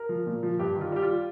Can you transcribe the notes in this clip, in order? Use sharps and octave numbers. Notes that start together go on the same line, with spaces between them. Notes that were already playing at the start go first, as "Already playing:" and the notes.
Already playing: A#4
F3
A#2
F3
G2 G4
D#3
F4
G3 G4
F4